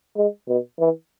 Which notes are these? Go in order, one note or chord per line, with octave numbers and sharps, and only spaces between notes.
G#3
B2
E3